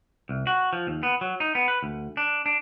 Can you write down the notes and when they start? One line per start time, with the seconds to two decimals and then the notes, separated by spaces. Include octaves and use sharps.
0.29 C2
0.47 F#4
0.73 F3
0.87 D#2
1.03 B3
1.21 F#3
1.40 D#4
1.55 B3
1.68 B4
1.83 D2
2.17 D4
2.46 D4